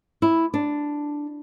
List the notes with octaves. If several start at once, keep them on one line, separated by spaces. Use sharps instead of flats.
E4
D4